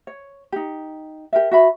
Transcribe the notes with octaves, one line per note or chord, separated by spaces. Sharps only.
C#5
D#4 G4
G4 A#4 E5
F#4 E5 B5